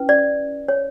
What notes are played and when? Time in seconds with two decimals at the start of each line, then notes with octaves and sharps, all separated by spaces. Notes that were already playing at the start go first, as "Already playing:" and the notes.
Already playing: C#4 E4 B4
0.09 D5
0.68 C#5